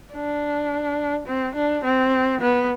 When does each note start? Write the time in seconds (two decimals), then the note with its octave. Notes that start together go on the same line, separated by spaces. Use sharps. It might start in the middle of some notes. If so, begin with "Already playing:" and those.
0.13 D4
1.26 C4
1.55 D4
1.84 C4
2.41 B3